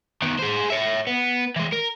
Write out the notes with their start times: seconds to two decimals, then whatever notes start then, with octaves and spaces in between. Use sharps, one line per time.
0.22 D#3 B3
0.39 G#4 C5
0.70 C#5 E5
1.07 B3
1.56 E3 G#3
1.72 A#4